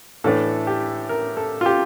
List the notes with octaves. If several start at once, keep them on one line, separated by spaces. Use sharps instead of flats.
A2 E3 A3 D4 A4
G4
A#4
A4
F4
G4